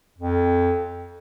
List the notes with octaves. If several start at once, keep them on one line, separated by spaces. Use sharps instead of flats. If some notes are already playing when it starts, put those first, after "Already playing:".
F2